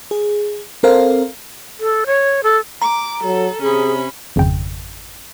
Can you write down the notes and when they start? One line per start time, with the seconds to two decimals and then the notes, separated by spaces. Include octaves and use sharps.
0.11 G#4
0.83 C4 A4 A#4 C5 F5
1.80 A4
2.06 C#5
2.43 A4
2.82 A#5 D6
3.23 F#3 A4
3.62 C3 C#4 G#4 B5
4.36 G#1 F2 C#3 G5